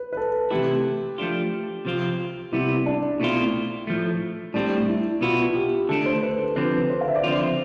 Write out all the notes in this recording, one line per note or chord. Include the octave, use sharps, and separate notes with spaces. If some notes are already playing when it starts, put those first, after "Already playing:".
Already playing: B4
B4
A4
C3 E3 A3 E4 G4
F3 A3 D4 F4
C3 F3 C4 F4
C3 G3 B3 E4
D4
B2 A3 C4 E4 F4
A2 F3 A3
A2 G3 C4 D4
E4
B2 B3 E4 F4
G4
D3 A3 D4 A4
C5
B4
A4
D3 F3 C4 B4
C5
F5
E5
D5
D3 F3 C4 F4 C5